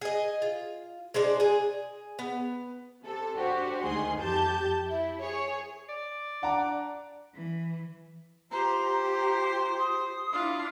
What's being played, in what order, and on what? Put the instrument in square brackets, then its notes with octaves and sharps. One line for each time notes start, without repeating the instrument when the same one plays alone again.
[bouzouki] G#4 D#5
F4
G#3 D4 C5 D5
G#4 G#5
B3
[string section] C3 A4
D4 F#4 G4 C5
D2 D#3 G#4 C6
F2 G4 A5 G6
E4
G#4 C#5
[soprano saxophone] D5
[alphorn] D4 [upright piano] F#5 A#5
[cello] E3
[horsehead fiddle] F4 G4 [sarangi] C5 [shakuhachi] A#5
[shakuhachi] A#5
C6
D#6
[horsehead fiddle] D4 E4 [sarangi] F4